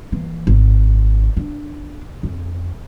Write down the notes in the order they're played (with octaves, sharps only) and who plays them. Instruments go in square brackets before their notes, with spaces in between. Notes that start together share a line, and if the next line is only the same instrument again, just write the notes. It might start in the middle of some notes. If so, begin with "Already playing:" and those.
[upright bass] E3 A#3
G#1
D4
F2